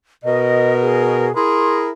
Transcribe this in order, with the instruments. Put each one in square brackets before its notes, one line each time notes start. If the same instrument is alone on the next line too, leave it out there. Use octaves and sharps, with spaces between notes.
[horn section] B2 A#4 [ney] D#5
[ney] G#4
[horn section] E4 G#4 A#4 [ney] C6